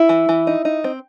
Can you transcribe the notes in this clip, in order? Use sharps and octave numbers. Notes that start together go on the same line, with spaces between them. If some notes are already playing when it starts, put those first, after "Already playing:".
Already playing: E4
E3
E3
D#4
D#4
C4